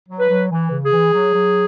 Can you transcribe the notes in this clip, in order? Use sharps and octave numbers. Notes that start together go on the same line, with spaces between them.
F#3
B4
F#3
E3
C#3
G#4
E3
F#3
F#3